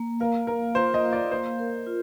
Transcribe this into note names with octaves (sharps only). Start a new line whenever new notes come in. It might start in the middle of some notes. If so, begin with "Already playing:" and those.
Already playing: A#3
A#4 F5
A#3 A#4
F4 C5
D#5
F5
D5
A#3 C5
A#4
F4